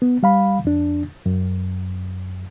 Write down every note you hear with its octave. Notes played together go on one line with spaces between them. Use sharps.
B3
G3 F5 B5
F2 D4
F#2